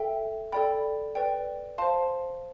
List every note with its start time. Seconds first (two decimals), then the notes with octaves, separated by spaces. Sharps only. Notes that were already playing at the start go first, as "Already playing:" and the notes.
Already playing: A4 E5 G5
0.52 A4 D5 G5 B5
1.15 B4 D5 G5
1.78 C5 F5 A5 C6